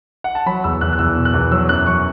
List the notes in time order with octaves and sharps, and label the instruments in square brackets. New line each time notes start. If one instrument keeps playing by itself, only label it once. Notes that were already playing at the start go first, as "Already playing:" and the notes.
[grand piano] F#5
A5
F#3 B5
E2 E6
E2 F#6
F#6
E2 E6
B2
F#6
E2
F#3 E6
F#2 F#6
F#3 C#6